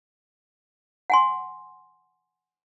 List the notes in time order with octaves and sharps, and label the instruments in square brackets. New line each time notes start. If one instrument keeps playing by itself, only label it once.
[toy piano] F#5 G#5 C6